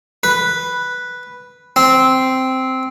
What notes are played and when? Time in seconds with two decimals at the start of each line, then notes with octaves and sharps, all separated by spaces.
0.23 B4
1.76 C4